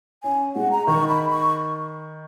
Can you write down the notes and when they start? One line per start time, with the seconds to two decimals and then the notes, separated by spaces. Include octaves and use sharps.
0.23 C#4 G#5
0.55 G#3 F#5
0.71 A#5
0.87 D#3 C#6
1.08 B5
1.29 C#6